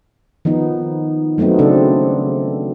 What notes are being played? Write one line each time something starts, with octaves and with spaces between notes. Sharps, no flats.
D#3 F3 B3 D#4
F#3 A3 B3 C4 D#4
C#3 F#3 C4 D4 A4